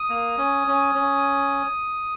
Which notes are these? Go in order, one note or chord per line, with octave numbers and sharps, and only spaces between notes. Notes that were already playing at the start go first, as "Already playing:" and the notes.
Already playing: D#6
A#3
C#4
C#4
C#4